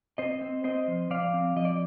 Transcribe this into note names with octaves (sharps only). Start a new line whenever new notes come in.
C4 C5 D#5
C4
C4 C5 D#5
F3
F3 D5 F5
C4
F3 D#5
D5